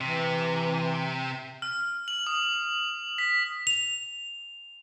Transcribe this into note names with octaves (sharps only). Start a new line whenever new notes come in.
C3 E3
F6
F#7
D#6
B6
F7